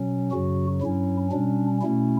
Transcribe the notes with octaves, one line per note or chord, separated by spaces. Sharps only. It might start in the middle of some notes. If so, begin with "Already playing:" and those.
Already playing: B2 F#3 C#4
F#2 C#3 F#3 F#4
G2 F#3 C#4 E4
B2 G3 C#4 D4
B2 A3 C#4 E4